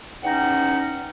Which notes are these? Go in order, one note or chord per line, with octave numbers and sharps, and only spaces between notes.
E2 C#4 D#4 F#5 G5